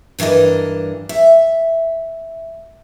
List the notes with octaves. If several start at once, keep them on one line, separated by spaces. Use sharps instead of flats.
G2 E3 D4 A#4 D#5
E5